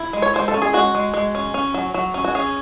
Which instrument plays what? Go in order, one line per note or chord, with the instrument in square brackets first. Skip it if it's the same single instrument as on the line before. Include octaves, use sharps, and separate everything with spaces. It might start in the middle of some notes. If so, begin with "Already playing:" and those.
Already playing: [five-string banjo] E4
G#3
C#5
G#3 C5
A4
C#4
G#4
G#3 F#4
G#3
G#3
C#4
C#4
F#3
F#3
C#4
F#4
C#4 G#4